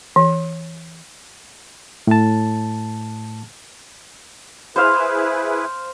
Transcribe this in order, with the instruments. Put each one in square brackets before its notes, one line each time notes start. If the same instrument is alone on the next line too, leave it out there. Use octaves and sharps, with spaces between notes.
[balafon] E3
[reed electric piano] A2 A5
[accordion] E4 G#4 B4 [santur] C5 F5